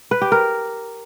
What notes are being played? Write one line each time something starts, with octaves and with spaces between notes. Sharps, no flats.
B4
G4
A#4